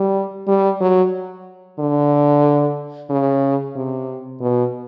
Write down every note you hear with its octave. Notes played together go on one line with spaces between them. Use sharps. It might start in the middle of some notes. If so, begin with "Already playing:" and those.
Already playing: G3
G3
F#3
D3
C#3
C3
B2